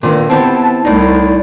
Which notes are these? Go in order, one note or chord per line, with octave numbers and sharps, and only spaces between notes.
A#2 D3 D#3 B3
B3 C4 E4 G4 A5
C2 A2 D#4 D5